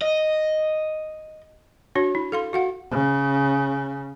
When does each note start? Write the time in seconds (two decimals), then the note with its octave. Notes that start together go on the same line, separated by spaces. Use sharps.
0.02 D#5
1.95 D4 F#4 C#5
2.15 E4
2.32 A4 F5 C6
2.53 F#4 F5 F#5
2.91 C#3